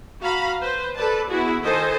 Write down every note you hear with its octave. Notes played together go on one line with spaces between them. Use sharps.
F#4 F5 A#5 B5
B4 C5
A4 B4 D5 A5
B3 E4 F#4 G#4
D#3 A4 C5 D#5 G#5 A5